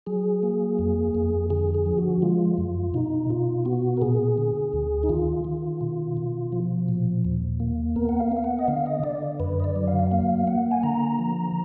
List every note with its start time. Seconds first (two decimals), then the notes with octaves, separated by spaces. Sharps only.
0.06 F#3 G#4
0.43 A#3
0.79 F2
1.15 F2
1.50 D3 G#4
1.74 G#4
1.86 F3
1.98 F#4
2.22 G#3 F4
2.58 F#2
2.94 B2 D#4
3.30 B2 F4
3.65 B3 F#4
3.97 A#4
4.01 A#2 G#4
4.38 D3
4.73 D2
5.03 D#4
5.09 D#3 F4
5.45 D#3
5.81 B2
6.17 B2
6.52 F3
6.88 A#2
7.25 D#2
7.60 A#3
7.96 B3 A#4
8.09 F#5
8.20 F5
8.32 B3
8.37 F5
8.44 F#5
8.59 D#5
8.68 D3 F5
8.86 D#5
9.04 D3 D5
9.40 F#2 B4
9.60 D#5
9.64 D5
9.76 F#3
9.87 F5
10.11 A#3 F5
10.47 A#3 F#5
10.71 G#5
10.83 D3 A#5
11.19 F3